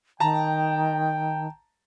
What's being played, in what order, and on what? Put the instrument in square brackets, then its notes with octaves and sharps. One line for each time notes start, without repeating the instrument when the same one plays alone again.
[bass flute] D#3 [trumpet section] G5 [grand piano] A5 A#5